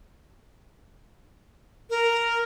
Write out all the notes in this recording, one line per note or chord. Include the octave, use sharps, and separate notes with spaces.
A#4